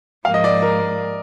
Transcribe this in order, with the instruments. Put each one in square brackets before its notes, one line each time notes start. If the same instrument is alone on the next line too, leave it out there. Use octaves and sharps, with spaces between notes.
[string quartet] G#2 F3 A#3 [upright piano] F5
[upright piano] D#5
D5
A#4